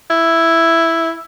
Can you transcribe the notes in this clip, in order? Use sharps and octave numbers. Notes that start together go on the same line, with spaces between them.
E4